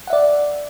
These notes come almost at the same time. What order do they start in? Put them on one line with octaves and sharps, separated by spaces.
F#5 E5 D5